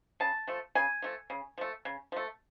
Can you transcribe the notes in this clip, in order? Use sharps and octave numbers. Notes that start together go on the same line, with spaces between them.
C#3 A5
F3 A3
C#3 G#5
F3 A3
C#3
F3 A3
C#3
F3 A3